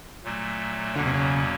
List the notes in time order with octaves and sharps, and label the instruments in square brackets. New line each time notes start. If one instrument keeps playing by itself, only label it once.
[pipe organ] A#2 F#3 A3
[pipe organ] E2 B2 F#3 A#3 C#4 [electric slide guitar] D3
[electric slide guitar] C3
C#3